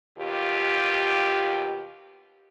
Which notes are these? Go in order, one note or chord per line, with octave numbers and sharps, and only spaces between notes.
D#2 B2 F4 G4